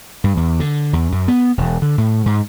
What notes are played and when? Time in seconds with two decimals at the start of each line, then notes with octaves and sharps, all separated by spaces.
0.24 G2
0.37 E2
0.60 D3
0.93 E2
1.12 F#2
1.28 B3
1.58 E1
1.82 D3
1.98 A2
2.26 G#2